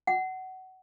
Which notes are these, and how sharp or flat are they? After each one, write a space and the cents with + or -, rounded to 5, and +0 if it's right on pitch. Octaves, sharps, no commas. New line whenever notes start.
F#5 +25